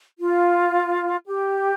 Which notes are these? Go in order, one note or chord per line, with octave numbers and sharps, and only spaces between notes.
F4
G4